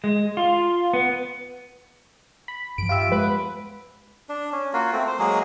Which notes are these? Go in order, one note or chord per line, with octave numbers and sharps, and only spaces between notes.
G#3
F4
B3
B5
G2 F3 D7
F4 G4 E5
G#3 B4
B3
D4
C#4
A#3 F4 F#4
A3 C4
C5
F#3 G#3 A#3 G#4